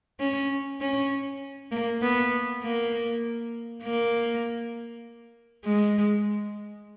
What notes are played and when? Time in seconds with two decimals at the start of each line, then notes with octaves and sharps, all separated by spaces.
0.20 C#4
0.81 C#4
1.71 A#3
2.02 B3
2.63 A#3
3.84 A#3
5.65 G#3